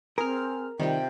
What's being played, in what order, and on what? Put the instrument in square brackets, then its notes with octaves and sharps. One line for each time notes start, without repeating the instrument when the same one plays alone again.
[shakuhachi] C4 [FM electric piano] G#4 F6 [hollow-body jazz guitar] A#4
[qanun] C3 F4 [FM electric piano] D#3 G3 [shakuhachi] G5